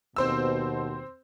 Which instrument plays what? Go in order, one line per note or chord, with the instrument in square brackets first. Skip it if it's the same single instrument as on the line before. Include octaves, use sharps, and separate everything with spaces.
[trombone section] D#2 B2 [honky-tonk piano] C4 C5 E6